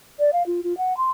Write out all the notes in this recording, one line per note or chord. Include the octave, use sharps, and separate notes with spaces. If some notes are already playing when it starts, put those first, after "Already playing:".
D5
F5
F4
F4
F#5
C6